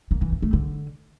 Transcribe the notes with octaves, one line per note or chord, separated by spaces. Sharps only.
A#3
E3
A#3
A3
D3